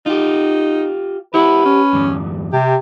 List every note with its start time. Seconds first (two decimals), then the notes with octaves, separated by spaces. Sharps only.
0.06 D#4 F4 G4
1.34 E4 G4 B4 C5 F#5
1.65 C#4
1.93 E2 G2
2.53 C3 G4